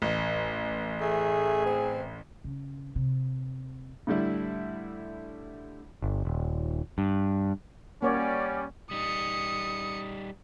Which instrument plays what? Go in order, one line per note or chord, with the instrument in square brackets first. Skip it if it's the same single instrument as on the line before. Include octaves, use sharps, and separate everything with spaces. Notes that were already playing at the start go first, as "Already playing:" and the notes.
[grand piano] A1
[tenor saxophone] A3 [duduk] G#4
[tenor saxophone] C4
[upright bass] C#3
C3
[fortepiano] A2 D3 G3 E4
[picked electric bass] G1
D#1
G2
[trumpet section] G3 C#4 [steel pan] A#3 C#5 [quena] D5 [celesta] F#5 D6
[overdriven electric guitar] G3 D#4 [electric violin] D#6 C#7